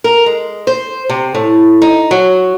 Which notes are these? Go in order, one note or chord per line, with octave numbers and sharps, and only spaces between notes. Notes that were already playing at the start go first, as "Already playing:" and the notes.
A#4
G#3
C5
C3
A2
D#4
F#3